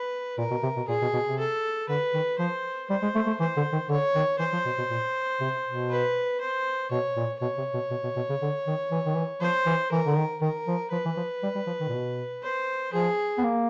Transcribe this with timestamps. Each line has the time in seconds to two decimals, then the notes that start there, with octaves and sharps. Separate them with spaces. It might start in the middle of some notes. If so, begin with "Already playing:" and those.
Already playing: B4
0.38 A#2 A#4
0.51 B2
0.63 C3
0.77 B2
0.88 A#2 G#4
1.02 B2
1.13 B2
1.26 C3
1.39 A4
1.89 D3 B4
2.14 D#3
2.39 F3 C5
2.90 G3 C5
3.03 G#3
3.15 A3
3.27 A3
3.40 E3 C5
3.56 D3
3.73 D#3
3.89 D3 C#5
4.15 D#3
4.39 E3 C5
4.53 F3
4.65 B2
4.78 B2
4.90 A#2
5.40 C3
5.66 B2
5.90 B4
6.41 C5
6.90 B2 C#5
7.16 A#2
7.41 B2 C#5
7.58 C3
7.74 B2
7.91 B2
8.03 B2
8.16 B2
8.29 C#3
8.42 D3
8.67 D#3
8.91 E3
9.05 D#3
9.16 E3
9.41 F3 C5
9.66 E3
9.92 E3 A#4
10.06 D3
10.17 D#3
10.41 D#3 A#4
10.67 F3
10.91 F3 B4
11.05 E3
11.17 F3
11.43 G3
11.55 G3
11.67 F3
11.80 D#3
11.88 A#2
11.93 B2
12.43 C5
12.93 F3 G#4
13.38 B3
13.44 A#3